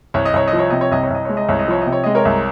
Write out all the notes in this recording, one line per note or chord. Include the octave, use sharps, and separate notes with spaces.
C2 C#5
D#5
C2 C#5
D#5
F3
C#5
C3 D#5
C#5
C2 D#5
C#5
C2 D#5
G#3 C#5
D#5
C2 C#5
D#5
F3 C#5
C3 D#5
C#5
G#3 D#5
A#4 C#5
C2